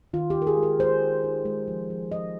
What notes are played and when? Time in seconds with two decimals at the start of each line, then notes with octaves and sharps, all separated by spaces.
0.13 D#3 F4
0.30 G4
0.36 D#4
0.42 A#4
0.47 G#4
0.57 G#3
0.63 A#4
0.79 G#3 C5
1.01 D#4
1.24 D#4
1.45 G#3
1.68 F3
1.90 F3
2.12 F3 D#5